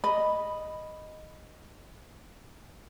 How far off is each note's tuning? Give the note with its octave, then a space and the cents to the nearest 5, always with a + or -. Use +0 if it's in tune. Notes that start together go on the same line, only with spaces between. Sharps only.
D#5 +0 B5 +0